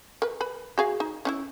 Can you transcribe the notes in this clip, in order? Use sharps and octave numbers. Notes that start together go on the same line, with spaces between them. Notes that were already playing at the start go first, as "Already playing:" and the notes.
A#4 B4
B4 B5
F#4 G#4 F5
D#4
C#4 D#4 E4